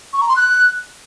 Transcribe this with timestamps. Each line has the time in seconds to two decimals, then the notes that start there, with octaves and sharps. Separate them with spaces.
0.13 C#6
0.21 A#5
0.29 C6
0.36 F#6